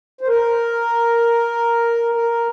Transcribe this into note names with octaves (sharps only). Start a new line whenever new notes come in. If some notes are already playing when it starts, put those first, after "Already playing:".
C5
A#4
A#4